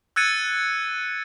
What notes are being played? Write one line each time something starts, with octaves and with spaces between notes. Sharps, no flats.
E6 F#6 G#6 A6 C#7 D#7